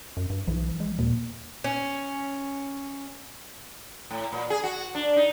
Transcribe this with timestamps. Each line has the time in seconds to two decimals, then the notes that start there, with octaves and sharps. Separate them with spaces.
0.17 F#2
0.30 G2
0.47 B1 E3 F3
0.80 G#3
0.98 D#2 A#2 A#3
1.64 C#4
4.11 A2
4.32 A#2
4.50 G#4
4.63 F#4
4.95 D4
5.16 D#4